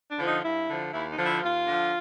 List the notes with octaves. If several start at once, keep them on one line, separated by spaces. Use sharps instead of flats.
D4
D3 F3
D#4
G2 E4
D3 F3
D#2 E4
D#4
D3 F3
E4
D#2 F4
D3 F3